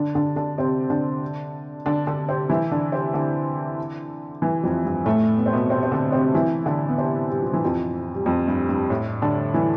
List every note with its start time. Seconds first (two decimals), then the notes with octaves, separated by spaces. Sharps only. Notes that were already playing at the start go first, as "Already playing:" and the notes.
Already playing: D3 D4
0.15 D3 D4
0.36 D3 D4
0.58 C3 C4
0.90 D3 D4
1.86 D3 D4
2.07 D3 D4
2.28 C3 C4
2.49 E3 E4
2.72 D3 D4
2.92 C3 C4
3.14 D3
4.42 E3
4.63 F2 F3
4.85 G2 G3
5.06 A2 A3
5.38 B3
5.46 C4
5.53 B2 B3
5.70 C3 C4
5.83 C4
5.92 D3 D4
6.12 C3 C4
6.34 E3 E4
6.66 D3 D4
6.89 B3
6.98 C3 C4
7.31 G3
7.42 F3
7.53 E3
7.65 F2 F3
8.15 G3
8.26 F2 F3
8.47 G2 G3
8.69 G2 G3
8.90 A2 A3
9.22 D3 D4
9.54 E3 E4